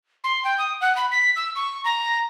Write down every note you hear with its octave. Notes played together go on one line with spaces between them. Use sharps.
C6
G5
D#6
F#5
B5
B6
E6
C#6
A#5